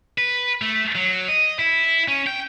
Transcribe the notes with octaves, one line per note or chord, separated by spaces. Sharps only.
B4
A3
F#3
D#5
E4
C#4
G5